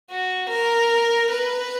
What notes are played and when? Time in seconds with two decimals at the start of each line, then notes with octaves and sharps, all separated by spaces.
0.10 F#4
0.50 A#4
1.31 B4